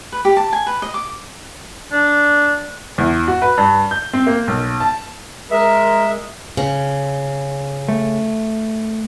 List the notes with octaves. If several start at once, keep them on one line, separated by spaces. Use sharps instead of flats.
B4
G4
A5
G#5
B4
D#5
D6
D4
E2
F#4
B4
G2
G6
C4
A#3
B1
A5
G#3 A#4 E5
C#3
A3